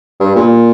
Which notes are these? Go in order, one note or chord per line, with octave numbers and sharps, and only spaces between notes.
G2
A#2